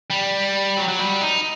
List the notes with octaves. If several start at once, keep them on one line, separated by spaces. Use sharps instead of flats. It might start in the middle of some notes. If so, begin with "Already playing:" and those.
G3
F#3
F#3
G3
D#4